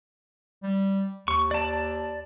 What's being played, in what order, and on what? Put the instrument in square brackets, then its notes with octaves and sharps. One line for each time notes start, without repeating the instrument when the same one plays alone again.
[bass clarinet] G3
[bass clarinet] D#2 [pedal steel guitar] C#6
[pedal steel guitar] D5 A5